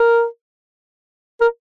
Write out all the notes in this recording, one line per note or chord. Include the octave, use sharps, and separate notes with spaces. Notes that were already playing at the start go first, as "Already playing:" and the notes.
Already playing: A#4
A#4